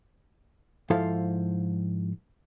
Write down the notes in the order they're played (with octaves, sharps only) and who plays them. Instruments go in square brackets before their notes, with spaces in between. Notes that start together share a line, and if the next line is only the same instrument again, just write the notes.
[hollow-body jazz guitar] G#2 F3 E4 A4 C5 F5